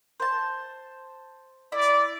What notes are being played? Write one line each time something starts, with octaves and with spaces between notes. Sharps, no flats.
C5 A5
E4 D5